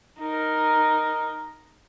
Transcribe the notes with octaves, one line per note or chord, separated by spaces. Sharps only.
D#4 A#4